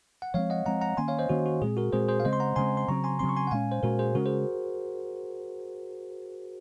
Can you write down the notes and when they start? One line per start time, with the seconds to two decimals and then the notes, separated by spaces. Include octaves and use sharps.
0.22 F#5
0.34 F3 G#3 C4 C#5 F5
0.50 D#5 F#5
0.66 F3 G#3 C4 F#5 A#5
0.81 F#5 A#5
0.97 D#3 A#3 C#4 G#5 C6
1.08 C#5 F5
1.19 C5 D#5
1.29 D#3 A#3 C#4 F#4
1.46 F#4
1.62 A#2 G#3 C4 G#4
1.77 F#4 A#4
1.93 A#2 G#3 C4 G#4 C5
2.08 G#4 C5
2.20 F5
2.25 C#3 G#3 C4 C5 D#5
2.33 C6
2.40 F#5 A#5
2.56 C#3 G#3 C4 G#5 C6
2.77 C6
2.88 C#3 F#3 C4 A#5 C#6
3.04 G#5 C6
3.19 C#3 F#3 C4 C6
3.29 C#6
3.36 G#5 C6
3.47 F#5
3.51 A#2 G#3 C#4 F5 G#5
3.72 C5
3.83 A#2 G#3 C#4 F#4 A#4
3.99 G#4 C5
4.15 C#3 G#3 C#4 F#4 A#4
4.26 G#4 C5